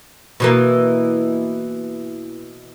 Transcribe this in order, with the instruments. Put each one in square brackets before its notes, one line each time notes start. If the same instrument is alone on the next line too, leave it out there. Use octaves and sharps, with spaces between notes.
[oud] B2 E3 A#3